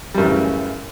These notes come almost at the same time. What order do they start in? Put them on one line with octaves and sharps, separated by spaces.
G3 F#2 E3 A2 C#3